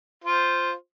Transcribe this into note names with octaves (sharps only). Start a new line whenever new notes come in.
F4 C5